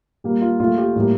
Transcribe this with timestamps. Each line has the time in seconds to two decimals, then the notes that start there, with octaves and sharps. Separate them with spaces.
0.24 A#2 G3 A#3
0.42 F4
0.60 A#2 A3 F4
0.78 G4
0.96 A2 G3 A#3